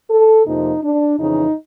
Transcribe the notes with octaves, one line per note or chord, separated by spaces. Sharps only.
A4
F2 C3 F3 A#3 D#4
D4
F2 C#3 E3 D#4